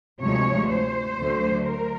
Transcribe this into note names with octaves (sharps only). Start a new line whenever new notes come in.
D2 C3 F3 G#3 C#5
C5
D2 D3 F#3 A3
A#4